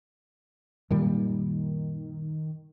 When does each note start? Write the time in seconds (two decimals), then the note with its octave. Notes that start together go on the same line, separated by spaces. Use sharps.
0.91 F#2 A#2 D#3 G3